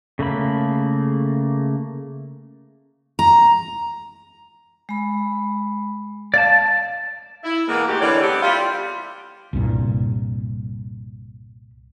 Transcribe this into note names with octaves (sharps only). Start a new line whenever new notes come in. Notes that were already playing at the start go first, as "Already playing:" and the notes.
C#3 A3 A#3 B5
A#5
G#3 B5
D5 F5 A5
E4
B2 E3 G#3 A#3
G#2 A3 F#4 G4
D3 E3 G3 G#3 C#5 D5
A3 B3 C4 G4
G3 E4 F4
C2 G2 A#2